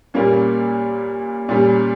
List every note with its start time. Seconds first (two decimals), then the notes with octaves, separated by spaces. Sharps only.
0.14 A#2 G3 A#3 C#4
1.49 A#2 G3 C#4